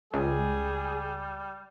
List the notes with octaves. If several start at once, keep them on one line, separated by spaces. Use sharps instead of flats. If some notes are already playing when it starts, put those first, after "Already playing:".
C#2 G3 G#4